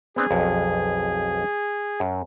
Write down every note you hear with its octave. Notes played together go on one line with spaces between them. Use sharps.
B3 C4 D4 G#4
B1 F2
F#2